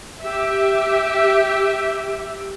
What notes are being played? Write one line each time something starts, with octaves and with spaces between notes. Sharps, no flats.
G4 E5